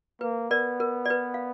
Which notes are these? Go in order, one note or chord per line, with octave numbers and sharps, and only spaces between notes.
A#3 B4
B3 A#4 D5
A#4
D5
B4
F5